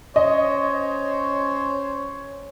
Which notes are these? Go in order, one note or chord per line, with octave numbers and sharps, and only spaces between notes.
C#4 C5 C#5 D#5